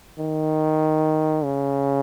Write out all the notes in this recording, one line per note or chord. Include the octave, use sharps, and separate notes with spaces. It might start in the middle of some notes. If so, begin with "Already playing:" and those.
D#3
C#3